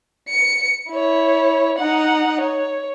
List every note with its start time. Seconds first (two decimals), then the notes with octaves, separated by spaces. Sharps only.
0.29 C#7
0.91 E4 C#5
1.79 D#4 F#5
2.41 C#5